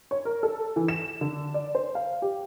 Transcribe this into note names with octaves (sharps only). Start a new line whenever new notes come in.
C#5
A#4
A4
E3
E7
D3
D5
C5
F5
G4